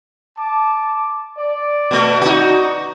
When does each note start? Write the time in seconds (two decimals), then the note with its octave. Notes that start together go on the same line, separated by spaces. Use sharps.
0.37 A5 D6
1.38 D5
1.91 B2 A3
2.21 D#4 F#4